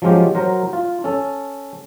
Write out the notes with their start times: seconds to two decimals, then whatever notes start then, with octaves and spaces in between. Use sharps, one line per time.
0.02 F3 F#3 G#3 C#4 F4 G4
0.35 F#3 A#4 C5 A#5
0.73 F4
1.04 C#4 A4